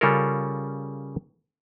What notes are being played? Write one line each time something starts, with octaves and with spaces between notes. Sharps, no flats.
C#3 G3 C#4 F4 A4 A#4